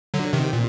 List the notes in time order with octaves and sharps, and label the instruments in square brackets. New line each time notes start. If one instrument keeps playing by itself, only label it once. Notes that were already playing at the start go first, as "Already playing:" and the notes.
[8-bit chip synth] D3 F#3
C3 D#3
A#2